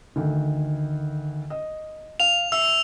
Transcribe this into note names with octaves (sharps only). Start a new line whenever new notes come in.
D2 D#3
D#5
F5 F7
E5 E6